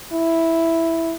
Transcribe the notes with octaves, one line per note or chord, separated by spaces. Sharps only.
E4